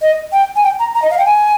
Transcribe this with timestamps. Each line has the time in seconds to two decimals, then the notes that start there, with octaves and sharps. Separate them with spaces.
0.01 D#5
0.32 G5
0.56 G#5
0.63 G5
0.79 A#5
0.95 A#5
1.02 D#5
1.10 F5
1.18 G5
1.25 G#5